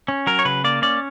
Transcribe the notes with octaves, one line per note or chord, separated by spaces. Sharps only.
C#4
F#3 A#4
C#5
C#3 B4
A#3 D5
C#4 D5